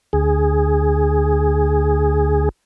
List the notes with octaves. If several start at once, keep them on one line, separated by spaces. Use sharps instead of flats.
D2 G#4